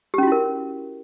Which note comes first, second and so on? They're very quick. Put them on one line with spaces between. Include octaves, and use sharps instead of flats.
G4 C#4 F#4 E4 A#4